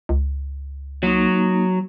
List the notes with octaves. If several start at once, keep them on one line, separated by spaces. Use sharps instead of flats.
C#2
F#3 A#3 D#4